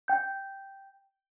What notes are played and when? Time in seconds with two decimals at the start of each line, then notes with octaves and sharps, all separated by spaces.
0.08 G5 G6